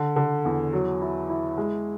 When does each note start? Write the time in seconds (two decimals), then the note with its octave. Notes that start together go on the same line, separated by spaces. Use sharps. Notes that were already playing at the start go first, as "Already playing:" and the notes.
Already playing: D3
0.16 D3
0.45 E2
0.73 F#3
1.01 E4
1.29 E4
1.58 G#3